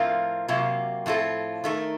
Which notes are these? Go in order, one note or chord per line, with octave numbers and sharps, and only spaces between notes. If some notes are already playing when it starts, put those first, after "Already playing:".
Already playing: A2 F3 C4 F4 A#4
C3 F#3 A#3 F4
A2 F3 C4 F4 A4
D#3 A3 D#4 A#4